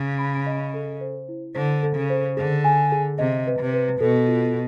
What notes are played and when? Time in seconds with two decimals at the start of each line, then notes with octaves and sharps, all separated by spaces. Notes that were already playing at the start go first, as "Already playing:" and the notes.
Already playing: C#3
0.19 B5
0.47 D#5
0.74 A4
1.01 C5
1.29 E4
1.55 D3 C5
1.83 A4
1.96 C#3
2.10 C5
2.37 D3 G#4
2.64 G#5
2.92 G#4
3.19 C3 D#5
3.47 B4
3.60 C3
3.74 B4
4.01 B2 A4
4.28 F4